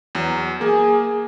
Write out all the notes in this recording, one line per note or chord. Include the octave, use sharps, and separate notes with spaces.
E2 F#3
A#3 G#4 G#5